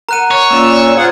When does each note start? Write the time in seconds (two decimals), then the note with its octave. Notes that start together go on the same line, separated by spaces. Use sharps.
0.09 A#4 F#5 A#5 F#6 D#7
0.31 C#5 F#6
0.50 A#2 A#3 C#4 D5 E6
0.97 F4 G#4 C5 F#5